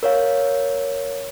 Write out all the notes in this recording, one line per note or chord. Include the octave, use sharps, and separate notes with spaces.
A#4 C#5 F5